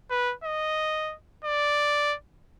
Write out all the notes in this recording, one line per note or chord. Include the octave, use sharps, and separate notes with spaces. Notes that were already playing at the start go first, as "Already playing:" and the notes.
B4
D#5
D5